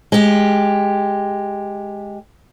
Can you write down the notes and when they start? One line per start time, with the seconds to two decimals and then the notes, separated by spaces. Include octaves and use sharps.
0.12 G#3 G4